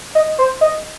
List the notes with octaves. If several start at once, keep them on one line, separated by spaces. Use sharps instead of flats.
D#5
C5
D#5